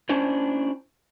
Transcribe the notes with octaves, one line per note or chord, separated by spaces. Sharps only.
C#4 D4 E4 C5